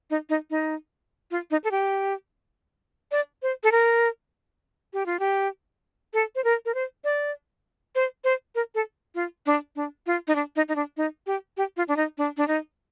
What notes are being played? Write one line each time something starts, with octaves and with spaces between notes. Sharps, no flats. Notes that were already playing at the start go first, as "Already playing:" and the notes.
D#4
D#4
D#4
F4
D#4
A4
G4
D5
C5
A4
A#4
G4
F4
G4
A4
C5
A#4
A#4
C5
D5
C5
C5
A#4
A4
F4
D4
D4
F4
D#4
D4
D#4
D#4
D4
D#4
G4
G4
F4
D4
D#4
D4
D4
D#4